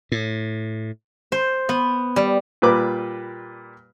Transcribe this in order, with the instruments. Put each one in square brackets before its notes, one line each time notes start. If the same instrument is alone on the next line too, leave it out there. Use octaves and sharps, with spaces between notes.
[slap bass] A2
[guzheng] C5
B3
G3
[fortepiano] A#2 G3 B4 D6